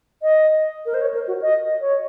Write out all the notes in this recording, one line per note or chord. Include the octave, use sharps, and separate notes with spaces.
D#5
A#4
C5
C#5
A#4
F#4
D#5
C#5